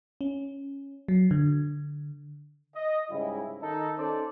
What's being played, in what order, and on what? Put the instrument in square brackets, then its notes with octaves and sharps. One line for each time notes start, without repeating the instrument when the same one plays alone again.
[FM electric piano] C#4
F#3
D3
[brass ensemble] D#5
G#2 C#3 G3 E4
D#3 D#4 A4
C#4 D#4 A4 C5 D5